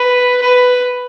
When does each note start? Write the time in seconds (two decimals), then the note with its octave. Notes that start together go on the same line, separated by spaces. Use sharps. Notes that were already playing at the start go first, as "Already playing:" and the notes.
Already playing: B4
0.41 B4